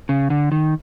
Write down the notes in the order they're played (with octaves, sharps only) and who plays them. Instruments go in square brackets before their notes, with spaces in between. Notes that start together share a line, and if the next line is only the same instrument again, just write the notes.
[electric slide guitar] C#3
D3
D#3